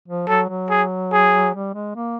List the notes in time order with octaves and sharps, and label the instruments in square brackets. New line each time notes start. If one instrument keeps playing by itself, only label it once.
[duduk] F3
[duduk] F#3 [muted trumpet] A4
[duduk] F#3
[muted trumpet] G#4
G#4
[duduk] G3
G#3
A#3